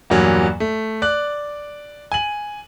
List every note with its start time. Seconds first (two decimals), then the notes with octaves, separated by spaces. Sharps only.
0.10 E2 G2 A#2 F#3
0.60 A3
1.02 D5 F#6
2.12 G#5 F#7